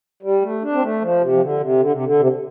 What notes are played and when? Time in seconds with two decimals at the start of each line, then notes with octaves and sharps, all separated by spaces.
0.23 G3
0.42 A3
0.62 D4
0.72 C4
0.82 A3
1.02 F3
1.21 C3
1.32 F3
1.41 D3
1.60 C3
1.80 D3
1.92 C3
2.05 D3
2.19 C3